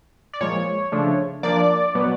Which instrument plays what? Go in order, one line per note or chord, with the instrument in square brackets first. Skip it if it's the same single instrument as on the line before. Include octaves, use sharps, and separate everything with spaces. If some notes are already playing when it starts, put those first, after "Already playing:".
[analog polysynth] D5
A#2 F3 G#3 C#5
C#3 F3 A3 D4
F3 A#3 D4 D5
B2 F#3 B3